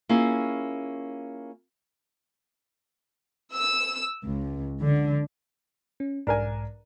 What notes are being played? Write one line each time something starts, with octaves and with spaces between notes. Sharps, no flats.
A#3 C#4 E4 F4 G#4
E6
C#2
D3
C#4
B1 G#2 D4 A#4 G#5 A#5